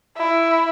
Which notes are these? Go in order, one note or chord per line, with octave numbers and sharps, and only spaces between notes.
E4